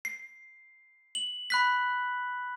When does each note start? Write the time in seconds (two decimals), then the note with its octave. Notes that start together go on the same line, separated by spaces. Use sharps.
0.05 C7
1.15 F#7
1.50 B5 F#6 B6